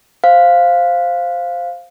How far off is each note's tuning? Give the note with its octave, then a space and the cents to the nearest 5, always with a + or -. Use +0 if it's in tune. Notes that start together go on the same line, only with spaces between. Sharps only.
C5 +0 F5 +0